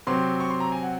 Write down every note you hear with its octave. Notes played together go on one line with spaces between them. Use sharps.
C3 F#3 C4 C6
C#6
C6
A#5
G#5
F#5